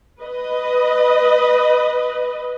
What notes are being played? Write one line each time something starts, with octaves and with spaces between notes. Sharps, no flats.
B4 D#5